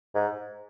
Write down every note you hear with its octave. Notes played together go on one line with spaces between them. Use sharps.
G#2